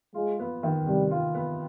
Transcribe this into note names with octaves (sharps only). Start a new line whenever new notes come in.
G#3 F4
B3
D#3
C3 G3
F4
B3